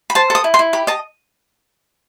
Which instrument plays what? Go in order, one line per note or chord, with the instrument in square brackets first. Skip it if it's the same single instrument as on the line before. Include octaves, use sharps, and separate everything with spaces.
[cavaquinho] B5
C5 A5
A4 D#6
E4
C6
E4
G4 B5
D#5 A5